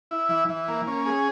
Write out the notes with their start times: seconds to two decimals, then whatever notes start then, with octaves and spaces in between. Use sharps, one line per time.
0.11 E4
0.29 E3
0.48 E3
0.68 A#3
0.87 C#4
1.06 G#4